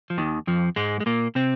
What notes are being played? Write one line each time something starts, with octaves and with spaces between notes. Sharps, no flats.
F3
D#2 D#3
F2 F3
G#2 G#3
G#3
A#2 A#3
C3 C4